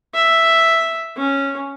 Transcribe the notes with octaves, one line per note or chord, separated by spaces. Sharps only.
E5
C#4